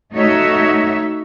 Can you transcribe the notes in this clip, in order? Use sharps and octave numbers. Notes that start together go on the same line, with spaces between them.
A3 D#4 F#4 C#5 E5